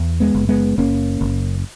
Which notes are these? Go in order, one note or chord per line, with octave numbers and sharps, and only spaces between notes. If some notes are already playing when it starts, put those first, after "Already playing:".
Already playing: E2
G#3 B3
F#1
G#3 B3
F#1 A#3 C#4
F#1